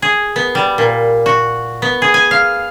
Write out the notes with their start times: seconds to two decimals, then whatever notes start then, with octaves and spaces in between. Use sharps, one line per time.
0.02 G#4
0.36 B3
0.55 G3
0.78 A#2
1.26 F#4
1.82 B3
2.02 G#4
2.14 G#5
2.31 F5